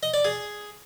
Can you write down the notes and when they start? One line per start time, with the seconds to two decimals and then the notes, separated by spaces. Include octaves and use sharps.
0.03 D#5
0.14 D5
0.25 G#4